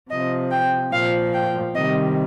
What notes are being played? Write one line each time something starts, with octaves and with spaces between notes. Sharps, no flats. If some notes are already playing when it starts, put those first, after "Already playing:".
C3 F3 D#5
G5
A#2 F3 F5
G5
C3 D#3 G3 D#5